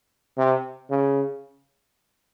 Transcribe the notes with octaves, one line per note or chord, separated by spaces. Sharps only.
C3
C#3